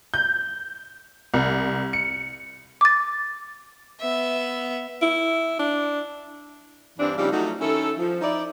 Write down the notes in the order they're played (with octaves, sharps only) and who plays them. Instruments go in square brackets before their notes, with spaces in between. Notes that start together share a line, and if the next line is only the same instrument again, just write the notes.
[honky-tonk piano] G6
C2
C#7
[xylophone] D6 A6
[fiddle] B3 E5
[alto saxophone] E4
D4
[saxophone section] G2 E3 G3 C4 D4
C#3 F3 G3 C4 D4 D#4
F#3 A3 D#4 F4 F#4
D#3 C#4 E4 A4
F3
D#4 E4 D5